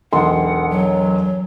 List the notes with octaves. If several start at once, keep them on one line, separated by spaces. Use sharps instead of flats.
E1 B1 F#5 C6
F#3